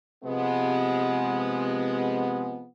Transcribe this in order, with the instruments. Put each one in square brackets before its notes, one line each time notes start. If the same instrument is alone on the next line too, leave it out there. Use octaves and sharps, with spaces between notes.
[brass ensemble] C3 F3 G#3 B3